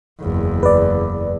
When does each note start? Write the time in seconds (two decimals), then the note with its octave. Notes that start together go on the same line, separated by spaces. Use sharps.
0.21 F#1 E2
0.63 B4 D5